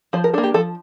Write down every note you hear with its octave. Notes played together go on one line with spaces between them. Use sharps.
F3 C5
A#4
A#3 D4 A4
G4
F3 A4